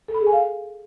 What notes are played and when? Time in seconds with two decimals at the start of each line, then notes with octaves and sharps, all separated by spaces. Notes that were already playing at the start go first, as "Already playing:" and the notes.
0.08 A4
0.14 B5
0.21 G#4
0.27 G#5
0.33 F5